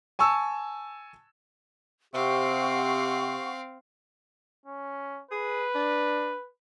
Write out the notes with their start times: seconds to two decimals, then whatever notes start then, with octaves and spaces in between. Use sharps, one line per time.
0.19 G#5 A5 C#6 E6
2.14 C3 C4 G4 F5 F#5 C#6
4.66 C#4
5.31 G#4 B4
5.75 D4